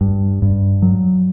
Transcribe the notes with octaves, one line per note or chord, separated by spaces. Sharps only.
G2
G2
F#3